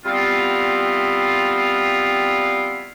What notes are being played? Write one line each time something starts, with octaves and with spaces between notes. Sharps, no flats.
G3 B3 C4 E4 F4